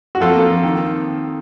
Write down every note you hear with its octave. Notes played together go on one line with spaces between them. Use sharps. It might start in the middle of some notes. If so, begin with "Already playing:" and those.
F#4
F2 F4 A4
A#3
F2
D#3